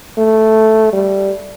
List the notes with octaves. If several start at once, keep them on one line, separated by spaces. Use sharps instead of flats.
A3
G3